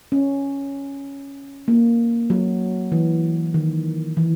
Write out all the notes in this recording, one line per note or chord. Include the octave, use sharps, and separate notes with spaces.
C#4
A#3
F#3
E3
D#3
E3